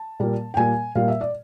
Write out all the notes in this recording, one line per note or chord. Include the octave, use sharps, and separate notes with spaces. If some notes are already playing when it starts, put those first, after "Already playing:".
Already playing: A5
A#2 G3 A#3
G5
A#2 G3 A#3 G#5
A#2 G3 A#3 F5
E5
D5